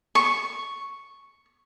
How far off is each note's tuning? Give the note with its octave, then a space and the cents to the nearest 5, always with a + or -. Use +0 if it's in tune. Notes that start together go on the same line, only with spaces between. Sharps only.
C#6 +0